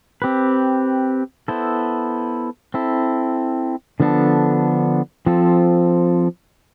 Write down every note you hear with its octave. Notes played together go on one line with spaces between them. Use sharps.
C4 G4 B4
B3 E4 A4 C5
C4 E4 A4
D3 F3 B3 D4 A4
F3 C4 F4 A4